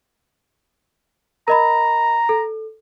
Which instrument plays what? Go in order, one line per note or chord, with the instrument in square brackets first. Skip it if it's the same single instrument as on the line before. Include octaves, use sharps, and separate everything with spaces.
[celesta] A#4 D#5 B5 [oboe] A#5
[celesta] A4